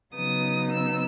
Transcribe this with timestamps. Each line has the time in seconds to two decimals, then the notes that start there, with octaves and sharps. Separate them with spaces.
0.15 C#3 F#3 B3 D#4 D#6
0.71 E6